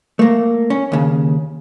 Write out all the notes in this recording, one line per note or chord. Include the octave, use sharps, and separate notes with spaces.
A3 A#3
C#4
D#2 C#3